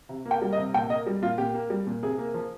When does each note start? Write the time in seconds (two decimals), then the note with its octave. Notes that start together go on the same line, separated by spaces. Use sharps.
0.09 C3
0.25 A#3
0.31 G5
0.42 G3
0.53 D#5
0.58 C3
0.74 A#2 G5
0.90 A#3 D#5
1.06 G3
1.22 A#2 F4
1.38 A#2 G4
1.54 A#3
1.70 G3
1.87 A#2
2.03 C3 G#4
2.18 A#3
2.34 F3